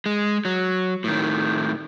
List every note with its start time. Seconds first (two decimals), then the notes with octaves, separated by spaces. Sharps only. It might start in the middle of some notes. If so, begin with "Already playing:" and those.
0.06 G#3
0.45 F#3
1.04 A2 D#3